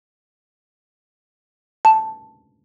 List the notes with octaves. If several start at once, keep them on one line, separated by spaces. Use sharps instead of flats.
A5